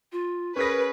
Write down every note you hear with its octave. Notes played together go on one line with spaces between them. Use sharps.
F4
C#4 G#4 A#4 B4 A#6